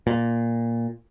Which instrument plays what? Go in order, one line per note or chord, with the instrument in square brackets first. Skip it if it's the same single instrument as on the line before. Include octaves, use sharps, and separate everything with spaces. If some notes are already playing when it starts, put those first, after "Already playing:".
[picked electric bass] A#2